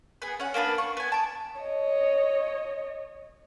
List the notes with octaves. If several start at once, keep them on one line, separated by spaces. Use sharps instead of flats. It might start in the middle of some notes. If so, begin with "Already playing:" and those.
B3 G#4
C#4 F#5
A#3 B3 D4 B4
C#6
B3 G#5
A5 D6
C#5 D#5